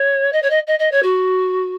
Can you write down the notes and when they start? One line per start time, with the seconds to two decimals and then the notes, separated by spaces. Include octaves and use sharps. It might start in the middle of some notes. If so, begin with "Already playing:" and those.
Already playing: C#5
0.32 D#5
0.42 C#5
0.50 D#5
0.67 D#5
0.79 D#5
0.91 C#5
1.02 F#4